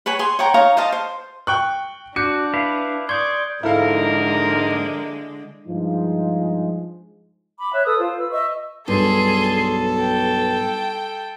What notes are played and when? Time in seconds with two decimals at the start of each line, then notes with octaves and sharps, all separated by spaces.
0.06 B4 C#5 G#5 B5
0.19 G#4 G#5 C6
0.39 C#5 F#5 G5 A#5
0.54 D#4 C#5 F5 A#5
0.77 C5 D#5 F5 A5
0.92 C5
1.47 G5 C#6 F#6
2.16 D4 F#4 D6 F#6 G6 C#7
2.54 E4 B4 F5
3.09 D5 C6 C#6 D#6 G6 G#6
3.63 G#2 D3 F3 G#3 E4 A4 A#4 F5
5.67 G2 F3 G#3 D#4 F4
7.58 B5 D6
7.72 C#5 E5 F#6
7.85 A4 B4 D#6 E6
7.99 F4 C5
8.19 B4 E6
8.31 D#5 E5 C#6 E6
8.88 B1 G2 G#4 A4 C6
9.99 G5